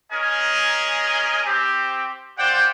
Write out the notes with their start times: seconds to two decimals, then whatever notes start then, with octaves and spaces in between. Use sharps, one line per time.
0.11 C#4 G#4 A#4 D#5 G#5
1.45 C4 G4
2.37 F4 G4 C5 D5 F#5 G5